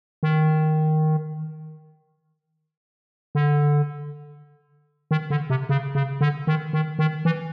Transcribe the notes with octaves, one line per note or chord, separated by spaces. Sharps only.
D#3
D3
D#3
D3
C3
C#3
C#3
D3
D#3
D#3
D#3
E3